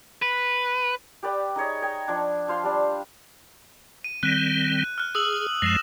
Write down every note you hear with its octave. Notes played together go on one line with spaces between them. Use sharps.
B4
G4 B4 D5 G5
D#4 G#4 C#5 D#5
D#5 G5 G#5
F3 D4
F4 C5 F5 C6
G3 D4
D#7
D#3 G3 C4 F#6
F6 F#6
G#4 D#6 E6 F#7
F#2 F3 G#3 A#6 E7